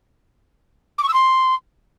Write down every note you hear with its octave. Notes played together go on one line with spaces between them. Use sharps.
D6
C#6
E6
C6